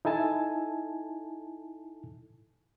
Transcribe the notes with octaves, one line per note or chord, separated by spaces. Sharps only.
D#4 E4 A4 G#5 A5